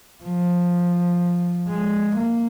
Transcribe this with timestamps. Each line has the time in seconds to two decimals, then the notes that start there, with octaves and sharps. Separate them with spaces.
0.24 F3
1.68 G#3
2.17 A#3